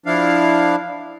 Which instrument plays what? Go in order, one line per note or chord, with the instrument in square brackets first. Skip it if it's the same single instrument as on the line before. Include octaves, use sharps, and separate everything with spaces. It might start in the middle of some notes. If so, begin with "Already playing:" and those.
[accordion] F3 D4 E4 F5